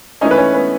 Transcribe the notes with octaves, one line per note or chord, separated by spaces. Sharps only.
E3 A3 C#4 D#4 D#5
B4
C#4 C#5
B3 B4